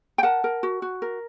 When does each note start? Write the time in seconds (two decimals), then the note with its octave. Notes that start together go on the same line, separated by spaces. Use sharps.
0.18 G5
0.23 A#4 F#5 A5
0.44 A#4
0.63 F#4
0.82 F#4
1.02 A#4